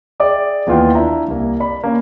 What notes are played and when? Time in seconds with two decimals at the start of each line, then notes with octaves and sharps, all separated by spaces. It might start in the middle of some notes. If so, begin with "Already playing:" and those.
0.20 G#4 D5 E5 G5 D6 D#6
0.67 D#2 E3 B3 F4 F#5 G5
0.95 D4 E4 E5 A#5
1.28 C2 A#3
1.60 D5 B5
1.84 A#3 C#4